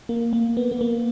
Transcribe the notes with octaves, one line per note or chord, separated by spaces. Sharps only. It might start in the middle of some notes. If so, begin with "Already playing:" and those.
A#3
A#3
B3
B3
A#3